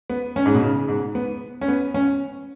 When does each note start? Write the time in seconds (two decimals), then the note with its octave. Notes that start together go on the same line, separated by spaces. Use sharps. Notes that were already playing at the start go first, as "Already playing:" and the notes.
0.10 B3
0.36 C#4
0.46 G#2
0.55 B2
0.63 C#3
0.89 G#2
1.15 B3
1.61 C#4
1.68 B3
1.94 C#4